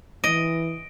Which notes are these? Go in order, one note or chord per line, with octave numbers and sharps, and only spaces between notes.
E3 D#5 D7